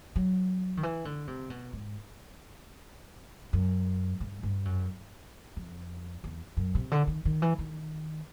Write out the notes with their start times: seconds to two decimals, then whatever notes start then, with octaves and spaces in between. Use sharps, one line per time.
0.16 F#3
0.77 D#3
0.83 E3
1.05 D3
1.27 C3
1.50 B2
1.73 G#2
3.53 F#2
4.20 G2
4.43 G2
4.65 F#2
5.56 F2
6.24 E2
6.57 F#2
6.75 C3
6.91 D3
7.07 D#3
7.25 D#3
7.42 E3
7.58 D#3